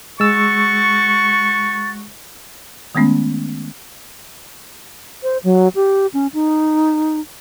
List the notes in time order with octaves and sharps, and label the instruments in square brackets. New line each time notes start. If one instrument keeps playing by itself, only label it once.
[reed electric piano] G#3 E6 [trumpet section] F#4 C#6 [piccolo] A6
[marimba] D#3 G#3 A3 B3 C#4
[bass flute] C5
F#3
G4
C#4
D#4